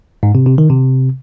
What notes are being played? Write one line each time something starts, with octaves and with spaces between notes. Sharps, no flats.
G#2
C3
C3
D#3
C3